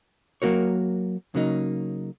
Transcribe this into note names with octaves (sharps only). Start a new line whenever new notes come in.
F#3 A#3 F#4 A#4 C#5
C#3 F#3 A#3 D#4